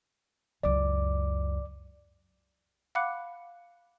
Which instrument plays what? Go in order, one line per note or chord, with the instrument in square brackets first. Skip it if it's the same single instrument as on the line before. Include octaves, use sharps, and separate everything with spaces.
[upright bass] C#2 F#2 [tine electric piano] D5 D6
[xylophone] F5 F#5 B5 D6 F#6 C#7